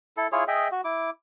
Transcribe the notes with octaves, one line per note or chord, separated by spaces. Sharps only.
E4 A4
E4 F4 G#4 C#5
G#4 D#5 E5 G5
F#4
E4 D6